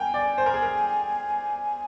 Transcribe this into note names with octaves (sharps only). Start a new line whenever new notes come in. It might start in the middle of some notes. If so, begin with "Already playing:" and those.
Already playing: A#4 G5 G#5
D5
C5
A#4
G#4
A#4